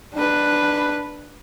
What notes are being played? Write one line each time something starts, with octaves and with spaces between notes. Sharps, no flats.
D4 B4